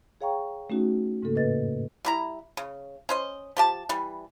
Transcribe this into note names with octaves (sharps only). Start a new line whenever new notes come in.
G#4 C#5 F5 G5 A#5 C#6
A3 C#4 D#4 F#4
G#2 C#3 A#3 A4
F2 A2 B4 D#5 A6
G3 E4 A#5
C#3
C#4 C5 D#5
F3 G4 A5
E3 G3